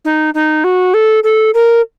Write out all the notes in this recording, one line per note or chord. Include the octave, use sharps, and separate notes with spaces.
D#4
D#4
F#4
A4
A4
A#4